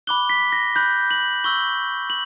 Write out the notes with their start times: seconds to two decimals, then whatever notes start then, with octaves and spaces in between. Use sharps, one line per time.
0.07 B5 D6 F#6 G7
0.30 B6
0.52 A#6
0.76 B5 F#6 G6
1.11 F#7
1.44 C#6 E6 G6 G7
2.10 F#7